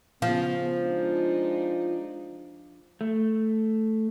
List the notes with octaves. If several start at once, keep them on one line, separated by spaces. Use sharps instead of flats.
C#3 F3 B3
G#3 D4 D#4
A3